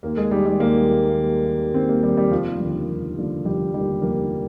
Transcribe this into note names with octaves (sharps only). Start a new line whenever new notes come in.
D#2 A#3
G#3
D#3 G3
G3
D#2 A#3
D#3
D#2
D#3
D#2 C4
A#3
D#3 G3
G3
F1 F3
D#2 D3 F3
F1
D#2 D3 F3
F1 G3
D#2 D3 F3 G3
F1 A#3